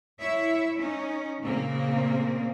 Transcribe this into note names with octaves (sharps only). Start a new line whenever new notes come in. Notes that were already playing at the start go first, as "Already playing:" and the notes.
E4 C#5 E5
C#4 D#4
A#2 C#3 A#3 C4